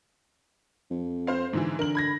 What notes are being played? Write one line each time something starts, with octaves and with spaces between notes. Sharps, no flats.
F2
C4 C5 F5
G#2 D3 E3
D3 A#4 F#7
B5 G#6 A#6